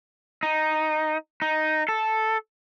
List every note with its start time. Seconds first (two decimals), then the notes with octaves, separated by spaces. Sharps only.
0.43 D#4
1.42 D#4
1.88 A4